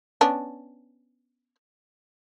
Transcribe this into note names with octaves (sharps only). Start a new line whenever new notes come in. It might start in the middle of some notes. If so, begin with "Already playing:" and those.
B3 C#4 D4